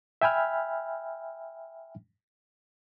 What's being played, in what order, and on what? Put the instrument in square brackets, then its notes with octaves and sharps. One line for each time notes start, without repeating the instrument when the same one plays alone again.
[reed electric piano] E5 G5 G#5 B5 F6